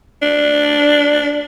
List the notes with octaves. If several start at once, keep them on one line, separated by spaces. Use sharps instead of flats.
D4